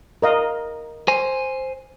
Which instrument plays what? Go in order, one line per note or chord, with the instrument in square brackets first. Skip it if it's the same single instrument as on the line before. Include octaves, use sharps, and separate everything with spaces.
[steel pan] A#4 D#5 F5
[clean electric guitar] C5 G#5